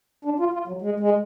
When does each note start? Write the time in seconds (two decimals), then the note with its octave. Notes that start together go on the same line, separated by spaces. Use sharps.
0.25 D4
0.40 F4
0.54 F4
0.68 F#3
0.82 G#3
1.00 G#3